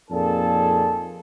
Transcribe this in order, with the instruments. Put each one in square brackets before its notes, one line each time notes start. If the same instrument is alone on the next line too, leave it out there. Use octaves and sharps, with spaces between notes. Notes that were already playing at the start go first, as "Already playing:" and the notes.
[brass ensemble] F2 A#2 D#4 G#4 A4 A5